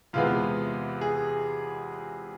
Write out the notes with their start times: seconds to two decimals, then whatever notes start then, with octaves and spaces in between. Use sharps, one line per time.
0.13 E2 C3 G#3 B3 F4
1.01 G#4